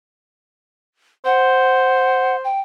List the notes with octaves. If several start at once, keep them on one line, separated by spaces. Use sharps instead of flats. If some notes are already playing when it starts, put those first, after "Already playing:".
C5 F#5
G5